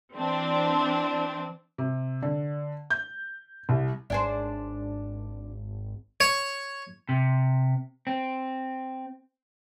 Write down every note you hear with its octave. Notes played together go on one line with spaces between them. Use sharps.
E3 C4 D4
C3
D3
G6
C2
G#1 D4 G#4 C5
C#5
C3
C4